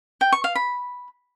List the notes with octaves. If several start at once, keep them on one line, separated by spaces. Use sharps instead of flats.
G5
C#6
F5
B5